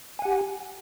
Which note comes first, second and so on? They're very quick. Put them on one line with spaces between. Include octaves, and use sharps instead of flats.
G#5 F#5 G4